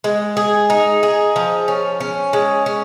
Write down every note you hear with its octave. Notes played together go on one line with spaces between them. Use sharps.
G#3
G#4
D#4
G#4
F3
C#4
C#4
G#3
C#4